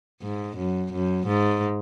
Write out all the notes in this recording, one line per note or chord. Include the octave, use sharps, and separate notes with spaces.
G#2
F#2
F#2
G#2